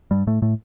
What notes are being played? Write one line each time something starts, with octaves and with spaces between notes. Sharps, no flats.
G2 G3
A2 A3
A2 A3